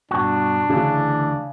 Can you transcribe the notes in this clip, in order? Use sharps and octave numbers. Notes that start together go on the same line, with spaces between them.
G2 B2 D4 F#4
D2 C#3 E3